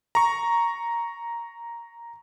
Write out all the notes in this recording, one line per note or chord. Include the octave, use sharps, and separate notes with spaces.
A#5 C#6